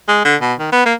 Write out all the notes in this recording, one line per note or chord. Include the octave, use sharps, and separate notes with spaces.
G#3
D3
B2
D#3
B3
A#3